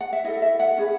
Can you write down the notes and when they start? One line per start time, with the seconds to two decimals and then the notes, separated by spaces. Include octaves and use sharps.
0.01 F#5
0.13 E5
0.24 E4 A4 D#5
0.42 E5
0.60 F#5
0.77 C#4 G#4 B4